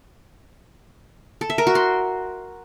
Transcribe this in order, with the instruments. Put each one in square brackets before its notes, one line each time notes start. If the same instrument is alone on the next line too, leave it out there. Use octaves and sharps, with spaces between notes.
[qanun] A4
E5
A#4
F#4
C6